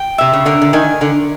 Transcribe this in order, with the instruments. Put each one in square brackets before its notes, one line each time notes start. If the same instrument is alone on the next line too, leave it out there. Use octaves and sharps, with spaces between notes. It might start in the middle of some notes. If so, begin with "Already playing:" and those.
Already playing: [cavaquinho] G5
[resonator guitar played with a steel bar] C3 [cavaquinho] E5
[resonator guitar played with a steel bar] C#3
[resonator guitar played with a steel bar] D3 [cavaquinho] A#4
[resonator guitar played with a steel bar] D3
[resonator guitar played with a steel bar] D#3 [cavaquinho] G#5
[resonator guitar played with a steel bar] D3 [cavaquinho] A#4